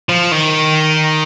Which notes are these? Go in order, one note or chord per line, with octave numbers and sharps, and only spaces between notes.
F3
D#3